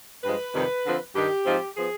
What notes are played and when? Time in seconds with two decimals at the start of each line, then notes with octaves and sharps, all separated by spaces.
0.24 G2 F3 G#3 B4
0.54 F2 C3 D#3 G3
0.85 D3 F3 C4
1.16 G2 D#3 G3 G4
1.46 G#2 F3 C4 D#4
1.77 F3 B3 G#4